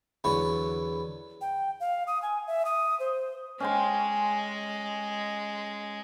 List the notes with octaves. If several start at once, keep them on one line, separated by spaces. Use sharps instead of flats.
E2 D3 F#3 B3 C#6
G5
F5
D#6
G#5
E5
D#6
C5
G#3 C#4 G5 C6